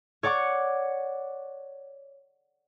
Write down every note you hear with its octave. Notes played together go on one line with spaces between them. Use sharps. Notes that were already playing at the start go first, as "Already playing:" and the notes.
C#5 D5 F#5 C#6 D6